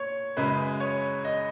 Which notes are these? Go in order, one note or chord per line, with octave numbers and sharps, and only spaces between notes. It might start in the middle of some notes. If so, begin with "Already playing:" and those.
Already playing: A#2 C#5
F#2 C#3 G#3 B4
C#5
D#5